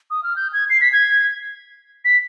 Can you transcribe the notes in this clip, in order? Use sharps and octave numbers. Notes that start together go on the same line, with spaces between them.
D#6
F6
G6
G#6
C7
B6
G#6
B6